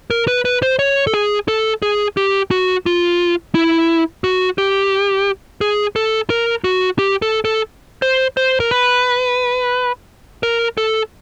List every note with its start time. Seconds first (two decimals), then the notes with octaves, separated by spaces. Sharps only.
0.10 A#4
0.28 B4
0.45 B4
0.62 C5
0.79 C#5
1.07 A4
1.14 G#4
1.48 A4
1.82 G#4
2.17 G4
2.51 F#4
2.86 F4
3.55 E4
4.24 F#4
4.58 G4
5.61 G#4
5.96 A4
6.30 A#4
6.64 F#4
6.99 G4
7.22 A4
7.45 A4
8.02 C5
8.37 C5
8.60 A#4
8.71 B4
10.43 A#4
10.78 A4